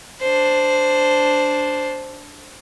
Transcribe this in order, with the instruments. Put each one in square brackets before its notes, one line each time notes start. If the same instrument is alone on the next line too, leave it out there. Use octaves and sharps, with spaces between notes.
[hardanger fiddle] D4 C5